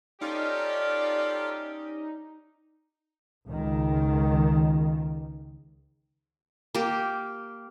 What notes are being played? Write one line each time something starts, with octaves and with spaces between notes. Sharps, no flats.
C#4 D#4 F4 G4 A4 D5 F5
C#2 D#3
A#3 G4